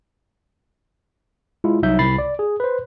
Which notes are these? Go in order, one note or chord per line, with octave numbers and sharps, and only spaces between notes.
G#3 E4 F4
C2 F#3 D#4 E5 G6
C2 B5 A6 C7
D5
G#4
B4 C5